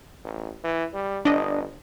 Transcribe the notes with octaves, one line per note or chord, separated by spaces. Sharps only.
A1
E3
G3
G1 D4 D#5